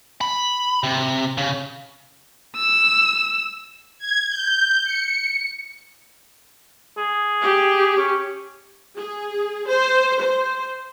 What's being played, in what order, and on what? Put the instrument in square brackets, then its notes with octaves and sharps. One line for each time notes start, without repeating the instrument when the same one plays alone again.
[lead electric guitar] B5
C3
C#3
[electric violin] E6
[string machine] G#6
G6
C#7
[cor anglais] G#4
[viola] G4
[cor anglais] C#4
[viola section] G#4
C5
C5